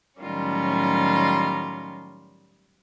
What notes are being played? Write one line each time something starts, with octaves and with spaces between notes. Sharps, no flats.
A2 D#3 F#3 G3 C#4 F4